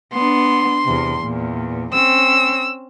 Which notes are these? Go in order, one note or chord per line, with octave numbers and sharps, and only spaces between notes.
B3 D4 C6
E2 C3
E2 A#2
C4 C#4 E6